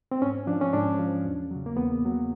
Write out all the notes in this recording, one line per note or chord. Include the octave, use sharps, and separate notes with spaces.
C4
G#2 C#4
F3 D4
C#4
G#2 D4
F3
E2
C#3 F#3
A#3
E2 B3
C#3 F#3